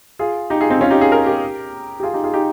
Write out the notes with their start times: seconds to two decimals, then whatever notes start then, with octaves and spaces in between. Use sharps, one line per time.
0.19 F4 G#4
0.50 D#4 G4
0.61 F4 G#4
0.70 C4 D#4
0.81 C#4 F4
0.90 D#4 G4
1.01 F4 G#4
1.12 A#4
1.26 G4 A#4
2.00 G4
2.03 F4 G#4
2.14 D#4 G4
2.24 F4 G#4
2.34 D#4 G4